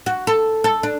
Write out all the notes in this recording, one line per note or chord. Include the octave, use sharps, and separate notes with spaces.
F#4
A4
A4
D4